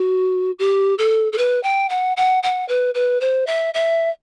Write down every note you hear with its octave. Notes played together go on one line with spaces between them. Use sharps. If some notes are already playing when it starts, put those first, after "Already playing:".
Already playing: F#4
G4
A4
A4
B4
G5
F#5
F#5
F#5
B4
B4
C5
E5
E5